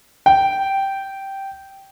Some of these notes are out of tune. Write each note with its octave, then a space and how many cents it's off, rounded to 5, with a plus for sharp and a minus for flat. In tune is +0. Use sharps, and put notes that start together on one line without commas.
G5 -10